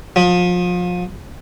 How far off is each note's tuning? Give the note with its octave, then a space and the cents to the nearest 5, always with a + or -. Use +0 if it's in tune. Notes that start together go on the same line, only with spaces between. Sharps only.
F3 +30